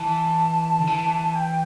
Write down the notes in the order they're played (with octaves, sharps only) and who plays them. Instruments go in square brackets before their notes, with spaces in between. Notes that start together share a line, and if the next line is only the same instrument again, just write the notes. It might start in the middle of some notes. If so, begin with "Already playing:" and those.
Already playing: [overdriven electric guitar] E3 [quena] A5
[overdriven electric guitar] D3
E3
[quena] G5